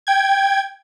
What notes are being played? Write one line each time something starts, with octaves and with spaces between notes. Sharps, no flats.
G5 G#6